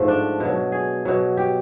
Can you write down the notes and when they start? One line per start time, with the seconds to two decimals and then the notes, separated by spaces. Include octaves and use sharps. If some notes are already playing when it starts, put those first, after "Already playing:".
Already playing: G#2 F3 A3
0.08 D4
0.40 B2 F#3
0.72 G#4
1.05 B2 F#3
1.37 G4